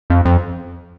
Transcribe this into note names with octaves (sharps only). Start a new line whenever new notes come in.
F2
F2